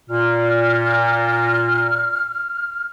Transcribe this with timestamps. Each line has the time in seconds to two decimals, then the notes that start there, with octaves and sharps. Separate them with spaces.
0.10 A#2 F6